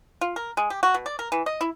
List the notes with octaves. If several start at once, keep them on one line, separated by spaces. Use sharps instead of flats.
F4
A#4
G#3
G4
F#4
B2
D5
A#4
E3
D#5
E4